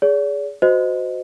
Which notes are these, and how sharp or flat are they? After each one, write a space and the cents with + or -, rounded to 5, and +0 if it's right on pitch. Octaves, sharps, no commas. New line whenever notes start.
G#4 +0 D5 -45
F#4 -10 C5 -25 D#5 +0